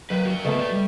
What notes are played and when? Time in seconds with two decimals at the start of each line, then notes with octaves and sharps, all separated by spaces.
0.10 D#3 F#3 A#3 B4 C5
0.26 F#4 A#4
0.45 C#3 A3 B3 B4 D#5
0.59 F#4 D5
0.72 G3